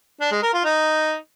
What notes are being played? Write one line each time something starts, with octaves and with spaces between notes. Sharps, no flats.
D4
G#3
A#4
F4
D#4